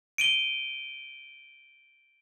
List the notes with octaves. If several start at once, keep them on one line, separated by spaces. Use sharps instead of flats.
D7 D#7 G7